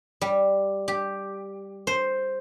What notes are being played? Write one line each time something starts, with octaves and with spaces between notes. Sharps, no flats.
G3
G4
C5